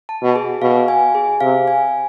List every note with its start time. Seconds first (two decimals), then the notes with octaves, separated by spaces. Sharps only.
0.09 A5
0.22 B2
0.36 G#4
0.62 B2 F5
0.88 G#5
1.15 G#4
1.41 C3 F5
1.68 G#5